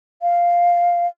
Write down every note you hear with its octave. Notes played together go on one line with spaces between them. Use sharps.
F5